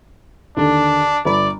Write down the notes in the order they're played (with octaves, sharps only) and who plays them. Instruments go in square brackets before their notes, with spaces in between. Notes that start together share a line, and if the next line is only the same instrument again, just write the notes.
[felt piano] D#2 D3 [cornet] D4
[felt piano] G1 B5 [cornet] D5